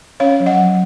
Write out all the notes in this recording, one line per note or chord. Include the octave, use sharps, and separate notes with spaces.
C#4 C#5 F5
F#3
D#5 F#5
F#3